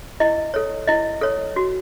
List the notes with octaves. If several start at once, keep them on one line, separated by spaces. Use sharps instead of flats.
E4 D#5
A4 C#5
E4 D#5
A4 C#5
F#4